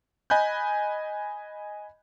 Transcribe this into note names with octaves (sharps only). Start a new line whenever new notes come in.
D#5 G#5 B5 F#6 G6